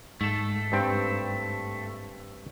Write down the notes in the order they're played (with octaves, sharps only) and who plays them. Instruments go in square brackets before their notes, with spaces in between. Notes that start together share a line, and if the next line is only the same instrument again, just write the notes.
[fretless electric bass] G#2 [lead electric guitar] A3 A4
[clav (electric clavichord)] G2 C4 G5